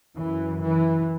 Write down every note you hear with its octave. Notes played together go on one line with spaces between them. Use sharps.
F#2 E3
E3